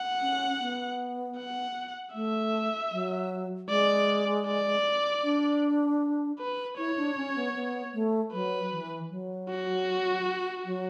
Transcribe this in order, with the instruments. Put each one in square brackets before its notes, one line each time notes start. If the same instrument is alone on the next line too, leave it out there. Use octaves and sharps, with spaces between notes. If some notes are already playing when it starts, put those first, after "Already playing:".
Already playing: [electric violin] F#5
[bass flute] C#4
B3
[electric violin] F#5
[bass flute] A3 [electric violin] E5
[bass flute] F#3
[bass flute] G#3 [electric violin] D5
[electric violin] D5
[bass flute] D4
[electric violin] B4
[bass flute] E4 [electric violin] C#5
[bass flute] D4
C#4
B3
B3
A3
[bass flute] F#3 [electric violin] B4
[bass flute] E3
F#3
[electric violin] F#4
[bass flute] F#3